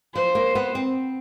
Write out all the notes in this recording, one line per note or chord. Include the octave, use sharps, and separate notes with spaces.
F3 C5
A#3
B3
C4